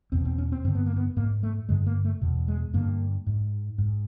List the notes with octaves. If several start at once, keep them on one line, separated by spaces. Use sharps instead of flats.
E2 B2 C4
C4
C#4
C4
G2 D3 C4
B3
A#3
B3
G#2 A#3
A3
G2 D3 G#3
A#3
A3
E2 B2
G#3
G2 D3 A#3
G#2
G#2